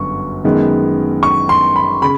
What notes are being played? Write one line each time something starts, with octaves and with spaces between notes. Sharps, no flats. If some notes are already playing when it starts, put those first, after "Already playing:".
Already playing: G1 F#2 F#3 C#6
F#2 D#3 G#3 B3
C#6
C6
B5
C#3 B5